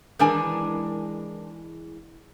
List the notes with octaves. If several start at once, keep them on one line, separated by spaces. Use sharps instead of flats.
D#3 E3 G#3 D4 A#4 G#5